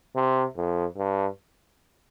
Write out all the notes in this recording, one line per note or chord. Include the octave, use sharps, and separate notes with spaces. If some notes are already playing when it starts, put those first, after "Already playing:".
C3
F2
G2